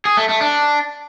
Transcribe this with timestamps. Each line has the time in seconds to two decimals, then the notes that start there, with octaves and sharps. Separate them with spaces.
0.05 G#4
0.17 A3
0.29 A3
0.41 D4